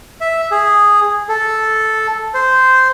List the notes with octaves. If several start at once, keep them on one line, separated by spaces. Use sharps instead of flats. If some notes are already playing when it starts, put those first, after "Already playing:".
E5
G#4
A4
C5